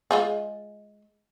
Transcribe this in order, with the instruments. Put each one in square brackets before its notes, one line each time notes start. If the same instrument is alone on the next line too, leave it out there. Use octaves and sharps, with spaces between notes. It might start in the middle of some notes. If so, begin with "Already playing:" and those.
[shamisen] G#3 F4 G#4